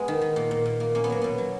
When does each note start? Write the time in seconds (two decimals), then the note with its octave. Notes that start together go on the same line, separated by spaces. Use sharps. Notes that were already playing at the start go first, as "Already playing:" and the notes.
Already playing: G#3 B3
0.08 D#3
0.22 D#3
0.36 A#2
0.51 A#2
0.66 A#2
0.80 A#3
0.95 A#3 C#4
1.04 B3
1.10 F#3 A#3
1.22 B2 B3
1.38 F#3